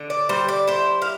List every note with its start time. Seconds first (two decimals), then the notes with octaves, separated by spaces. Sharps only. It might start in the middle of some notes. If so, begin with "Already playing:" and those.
Already playing: D3
0.10 D5
0.29 G3 C5
0.48 D5
0.68 E4 C5
1.02 F5